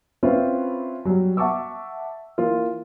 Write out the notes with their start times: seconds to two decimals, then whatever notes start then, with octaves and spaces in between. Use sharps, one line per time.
0.23 C4 C#4 E4 F4 B4 C5
1.05 F#3 G3
1.37 E5 F#5 A5 C#6 D6 E6
2.38 E3 A#3 F4